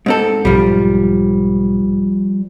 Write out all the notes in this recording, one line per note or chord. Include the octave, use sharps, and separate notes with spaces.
G#2 C4 A4
B1 G#2 F3 G3